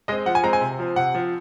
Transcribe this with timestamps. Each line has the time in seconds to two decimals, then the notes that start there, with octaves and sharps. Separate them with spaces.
0.08 G#3 C4 D#5
0.26 F3 F#5
0.35 G#5
0.43 G#3 C4 A#5
0.53 G#5
0.61 C3
0.79 F3 C4
0.96 C3 F#5
1.15 F3 C4